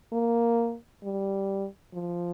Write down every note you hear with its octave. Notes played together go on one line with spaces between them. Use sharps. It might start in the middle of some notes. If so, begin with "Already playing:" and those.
A#3
G3
F3